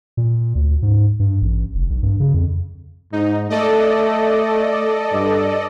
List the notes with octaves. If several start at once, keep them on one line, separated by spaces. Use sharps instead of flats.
A#2
D2
G#2
G2
A1
F1
B1
G2
C#3
F2
G#2 D#4
A3 A4 D5 D#5
G2